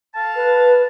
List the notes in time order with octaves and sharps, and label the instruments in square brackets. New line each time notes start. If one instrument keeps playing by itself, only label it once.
[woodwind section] A4 F5 A5
[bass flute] B4